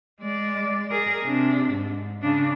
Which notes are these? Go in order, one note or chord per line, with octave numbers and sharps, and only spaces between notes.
G#3 D5
G#4 A#4
C3 D4
G#2
C#3 D4